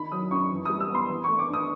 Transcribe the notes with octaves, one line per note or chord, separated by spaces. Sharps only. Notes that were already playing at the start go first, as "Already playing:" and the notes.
Already playing: D#3 B5
F#3 D#6
F#2 C#6
E3
G3 D#6
E6
B3 C6
E3
A3 C#6
D6
D4
D#6